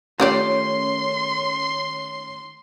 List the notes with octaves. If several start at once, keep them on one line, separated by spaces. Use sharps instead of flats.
D#3 A3 C#4 F4 G4 D5 C6